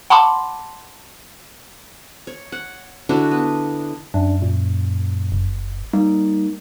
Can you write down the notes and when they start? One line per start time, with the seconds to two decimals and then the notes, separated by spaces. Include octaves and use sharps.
0.10 F#5 A5 B5 C6 D6
2.27 C#5
2.52 F#5
3.09 D3 D4 E4 F#4
3.31 B3
4.14 F#2 D4
4.42 A#2
5.32 F#1
5.93 G3 A#3 D#4